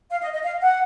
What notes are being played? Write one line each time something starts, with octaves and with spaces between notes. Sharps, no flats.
F5
D#5
D#5
F5
F#5